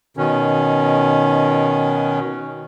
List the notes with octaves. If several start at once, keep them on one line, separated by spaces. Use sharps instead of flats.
B2 D#3 C#4